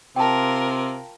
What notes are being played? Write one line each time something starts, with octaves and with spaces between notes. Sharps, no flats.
C3 F4 A#4 G5 A5